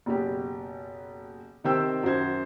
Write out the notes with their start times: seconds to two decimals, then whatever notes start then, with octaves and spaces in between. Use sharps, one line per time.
0.06 F#1 B2 G4
1.64 C3 D#3 G4 C5 G5 E6
2.03 F#2 F#4 C5 G#6